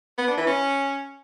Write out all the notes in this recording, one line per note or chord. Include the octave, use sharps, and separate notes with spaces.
B3
D4
E3
C#4